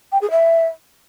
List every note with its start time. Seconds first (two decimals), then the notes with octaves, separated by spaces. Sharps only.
0.12 G5
0.22 G#4
0.31 E5